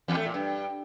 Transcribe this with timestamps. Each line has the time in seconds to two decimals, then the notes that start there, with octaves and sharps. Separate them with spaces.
0.08 E2
0.17 A3
0.25 A#2
0.34 G2